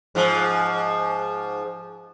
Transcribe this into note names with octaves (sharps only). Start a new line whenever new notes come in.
G#2 F3